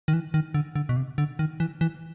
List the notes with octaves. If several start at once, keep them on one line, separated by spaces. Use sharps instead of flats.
D#3
E3
D#3
D3
D3
B2
C3
D3
D#3
E3
E3